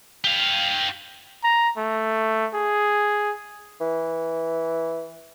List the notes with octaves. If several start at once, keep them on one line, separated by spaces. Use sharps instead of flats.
G4 F5
A#5
A3
G#4
E3